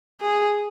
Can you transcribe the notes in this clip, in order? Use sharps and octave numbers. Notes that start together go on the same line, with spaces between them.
G#4